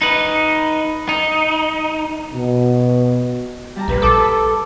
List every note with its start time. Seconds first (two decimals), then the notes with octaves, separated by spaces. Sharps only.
0.02 D#4 B4
1.09 D#4
2.33 B2
3.76 G3 A5 A#5
3.88 A#1 G4 B4
4.02 A4 D6 D#6
4.17 B4